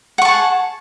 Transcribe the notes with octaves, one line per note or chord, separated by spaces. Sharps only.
G#4 F#5 A5 C#6